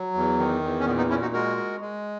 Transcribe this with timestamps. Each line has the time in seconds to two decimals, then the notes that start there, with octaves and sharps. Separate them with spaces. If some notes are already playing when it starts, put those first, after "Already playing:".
Already playing: F#3
0.15 E2
0.38 D#3
0.62 E2
0.80 C#4
0.86 A#2 B3
0.98 B3 D#4
1.09 A#2 C#4 E4
1.22 D#4 F#4
1.33 G#3 F#4 A#4
1.57 G#3
1.81 G#3